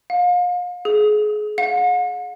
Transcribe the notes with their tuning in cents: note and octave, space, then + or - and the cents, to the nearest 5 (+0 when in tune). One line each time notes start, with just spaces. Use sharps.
F5 +35
G#4 +30
F#5 -45